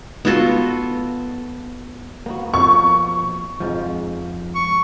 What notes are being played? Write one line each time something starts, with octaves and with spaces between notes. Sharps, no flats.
B3 F4 F#4 A4
A#3 B3 F#4
B2 F3 A#3 C#6
F2 G#2 F3
C#6